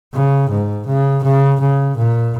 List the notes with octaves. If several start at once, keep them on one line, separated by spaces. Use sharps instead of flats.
C#3
G#2
C#3
C#3
C#3
A#2